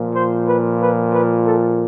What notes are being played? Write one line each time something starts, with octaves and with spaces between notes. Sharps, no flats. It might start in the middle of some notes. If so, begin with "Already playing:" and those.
Already playing: A#2 F3
C5
B4
B4
B4
A4